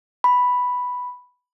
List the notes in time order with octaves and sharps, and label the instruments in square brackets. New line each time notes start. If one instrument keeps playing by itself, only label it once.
[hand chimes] B5